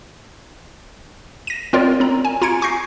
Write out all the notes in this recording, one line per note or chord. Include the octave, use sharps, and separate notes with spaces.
A#6 D#7
C4 F4 A#4 C#5 D5
C4 A#5
G#5
F4 A#5 G#6 C#7 D7
G#5 C#6 G6 A#6 C7